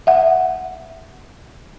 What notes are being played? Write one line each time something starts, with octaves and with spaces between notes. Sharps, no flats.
E5 F#5